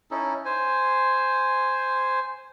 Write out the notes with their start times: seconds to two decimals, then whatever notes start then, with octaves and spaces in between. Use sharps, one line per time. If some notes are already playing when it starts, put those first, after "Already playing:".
0.11 C#4 D#4 E4 A4
0.45 C5 G#5